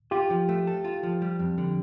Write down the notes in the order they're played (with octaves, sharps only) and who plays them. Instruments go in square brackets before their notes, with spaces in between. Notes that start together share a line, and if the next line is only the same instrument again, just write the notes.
[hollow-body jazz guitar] F4 [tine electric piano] G4
[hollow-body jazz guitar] F3
A3
A4
F4
F3
G3
F2
D3